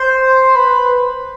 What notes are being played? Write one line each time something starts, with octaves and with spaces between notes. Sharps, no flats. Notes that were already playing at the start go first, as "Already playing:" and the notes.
Already playing: C5
B4